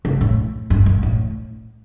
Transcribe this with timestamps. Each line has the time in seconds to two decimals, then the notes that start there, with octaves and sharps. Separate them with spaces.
0.05 C#3
0.21 A2
0.70 G2
0.86 A#2
1.03 A2